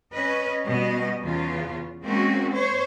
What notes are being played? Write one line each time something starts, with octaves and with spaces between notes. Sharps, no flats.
C#4 B4 D#5
B2 G3 B3 D#5
E2 C#3 B3 F4
G#3 A#3 C4 C#4 F#4
C5 C#5